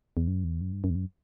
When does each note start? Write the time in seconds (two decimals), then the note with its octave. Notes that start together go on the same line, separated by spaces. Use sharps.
0.17 E2
0.28 F#2
0.44 E2
0.61 F#2
0.72 G2
0.84 F#2
0.90 E2
0.95 F#2